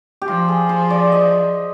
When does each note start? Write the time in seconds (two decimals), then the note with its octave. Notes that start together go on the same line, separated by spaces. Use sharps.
0.22 G4
0.27 F3 F4
0.48 G#4
0.69 C5
0.90 D5
1.12 D#5